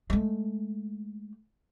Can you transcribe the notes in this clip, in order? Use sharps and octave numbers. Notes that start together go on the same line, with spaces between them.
G#3 A3